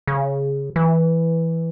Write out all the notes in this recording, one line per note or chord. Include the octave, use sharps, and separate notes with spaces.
C#3
E3